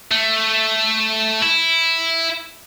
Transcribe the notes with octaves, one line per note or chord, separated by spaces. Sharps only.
A3
E4